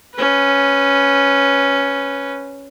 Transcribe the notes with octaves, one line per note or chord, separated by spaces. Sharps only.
C#4 B4